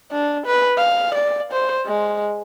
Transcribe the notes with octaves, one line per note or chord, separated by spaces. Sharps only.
D4
B4
F5
D5
C5
G#3